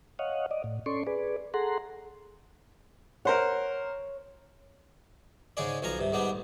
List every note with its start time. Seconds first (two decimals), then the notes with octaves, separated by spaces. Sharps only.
0.19 C#5 D#5 F5 F#5
0.51 D5 D#5
0.64 A2
0.86 C#4 A4 D5 C6 C#6
1.07 G#4 B4 D5
1.54 G#4 A4 F#5 A#5 C6
3.25 A#4 C5 C#5 F#5
5.57 G#2 C#3 G#3 G#4 D5
5.82 B1 F3 F4 G#5 A#5
5.99 G2 C3
6.12 G#2 G3 B3 D4
6.29 A1